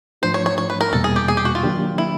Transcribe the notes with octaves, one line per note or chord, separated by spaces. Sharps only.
G#2 F3 A3 D4 F4 C5
C#5
C#5
C#5
B4
A#4
E2 B2 G3 A#3 A4
G#4
G4
G#4
G4
F#4
F4
D#3 F#3 A#3 D4 G4
E4